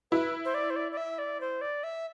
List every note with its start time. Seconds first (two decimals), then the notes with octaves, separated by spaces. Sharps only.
0.11 E4 B4
0.45 C5
0.54 D5
0.70 C5
0.76 D5
0.92 D5
0.97 E5
1.18 D5
1.41 C5
1.61 D5
1.84 E5